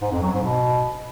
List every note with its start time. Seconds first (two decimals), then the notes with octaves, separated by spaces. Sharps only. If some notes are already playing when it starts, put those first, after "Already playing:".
0.01 G#2
0.12 F2
0.22 F#3
0.32 G#2
0.43 B2